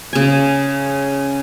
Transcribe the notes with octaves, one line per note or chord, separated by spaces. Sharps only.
C#3 G#5